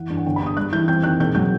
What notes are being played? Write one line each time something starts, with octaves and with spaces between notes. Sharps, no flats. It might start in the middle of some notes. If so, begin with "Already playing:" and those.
Already playing: E3 F#5
G2
F#5
G1 G5
B5
G2 D#6
G3 F#6
E3 G6
C4 G6
D#3 F#6
E1 G6
F#3 G6